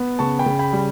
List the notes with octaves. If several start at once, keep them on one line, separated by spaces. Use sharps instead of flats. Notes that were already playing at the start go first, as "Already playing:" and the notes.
Already playing: B3
C#3 A5 C#6
G5 B5
C#3
G5 B5
G3